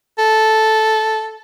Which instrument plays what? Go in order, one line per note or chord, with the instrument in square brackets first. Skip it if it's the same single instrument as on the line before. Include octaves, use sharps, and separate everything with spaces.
[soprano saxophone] A4